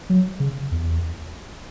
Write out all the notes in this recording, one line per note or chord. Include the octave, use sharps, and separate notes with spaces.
F#3
C#3
E2